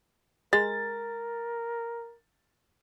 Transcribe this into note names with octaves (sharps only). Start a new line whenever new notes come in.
G#3 A#4 A6